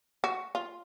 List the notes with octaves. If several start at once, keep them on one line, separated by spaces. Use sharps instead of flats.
F#4
F4